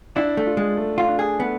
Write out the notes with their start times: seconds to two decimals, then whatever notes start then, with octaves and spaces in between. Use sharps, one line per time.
0.16 D4 E4
0.37 A3
0.47 F4
0.57 G#3
0.77 A3
0.98 F4
1.08 D4
1.19 G#4
1.39 A3 B3